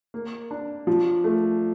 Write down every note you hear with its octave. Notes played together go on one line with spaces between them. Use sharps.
A#3
D4
F3
A3